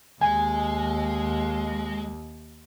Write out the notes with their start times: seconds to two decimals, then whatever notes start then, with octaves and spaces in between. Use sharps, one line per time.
0.21 D#2 G#3 G#5